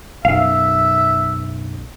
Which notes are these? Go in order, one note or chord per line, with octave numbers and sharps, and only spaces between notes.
B1 F#2 E5 F5